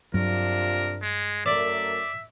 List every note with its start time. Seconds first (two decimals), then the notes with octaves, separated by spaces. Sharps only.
0.14 G2 C3 F#3 D4 F4 A#4
1.02 G#3
1.46 F#2 A3 A#4 D5 E5